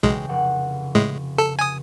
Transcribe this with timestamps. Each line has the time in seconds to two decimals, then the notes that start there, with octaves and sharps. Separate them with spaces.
0.03 B1 C#3 E3 G#3 G5
0.29 F1 F#5
0.95 A2 G#3
1.38 A4
1.59 G#5 D#6